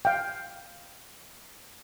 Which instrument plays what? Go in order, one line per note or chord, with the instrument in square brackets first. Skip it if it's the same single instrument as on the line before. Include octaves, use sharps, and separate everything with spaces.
[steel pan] F5 G5